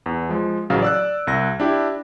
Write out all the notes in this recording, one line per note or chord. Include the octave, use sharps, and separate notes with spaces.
E2
F3 G#3
A1 C#3 F#3 F5
D5 E6 F#6
C2 A#6
D4 E4 G4